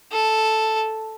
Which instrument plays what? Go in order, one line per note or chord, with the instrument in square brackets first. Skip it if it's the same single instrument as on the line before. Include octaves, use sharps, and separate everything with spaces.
[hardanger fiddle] A4